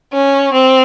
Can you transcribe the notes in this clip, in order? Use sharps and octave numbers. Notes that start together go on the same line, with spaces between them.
C#4
C4